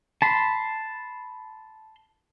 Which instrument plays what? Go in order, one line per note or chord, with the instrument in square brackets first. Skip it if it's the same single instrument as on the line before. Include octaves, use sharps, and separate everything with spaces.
[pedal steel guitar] A5 B5 C6